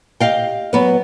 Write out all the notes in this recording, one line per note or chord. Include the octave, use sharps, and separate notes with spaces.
G4 D#5 F5 G5
F#3 B3 B4